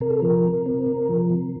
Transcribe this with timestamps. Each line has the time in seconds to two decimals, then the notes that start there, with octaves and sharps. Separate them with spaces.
0.01 C3 A#4
0.10 A4
0.20 F3 A#4
0.44 C3
0.66 C4
0.86 C3
1.09 F3
1.30 C3